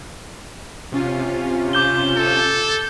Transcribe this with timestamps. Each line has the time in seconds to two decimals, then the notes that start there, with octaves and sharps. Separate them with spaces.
0.92 C3 C#4 F4
1.73 D6 G6 G7
2.16 A4